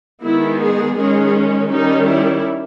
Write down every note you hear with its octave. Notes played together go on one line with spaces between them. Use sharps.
D#3 G#3 B3 E4
G#4
D#3 G#3 C#4 G#4
D#3 G3 C#4 D#4
E4